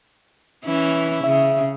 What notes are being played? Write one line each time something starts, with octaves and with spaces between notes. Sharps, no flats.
E3 C#4 E4
C#3 E5